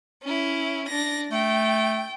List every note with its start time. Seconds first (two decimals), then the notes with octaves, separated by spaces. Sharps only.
0.23 C#4 E4
0.88 D4 A#6
1.32 A3 G5